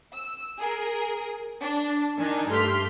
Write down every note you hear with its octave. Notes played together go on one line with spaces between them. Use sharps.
E6
G#4 A#4
D4
D#3 D4 D#4 G#5
G2 A3 G4 C6 F6 B6